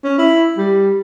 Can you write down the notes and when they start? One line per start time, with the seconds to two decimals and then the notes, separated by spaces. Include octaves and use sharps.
0.04 C#4
0.18 E4
0.57 G3